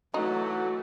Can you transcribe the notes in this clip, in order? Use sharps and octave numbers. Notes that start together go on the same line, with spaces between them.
E3 F#3 A3 D#4 F#4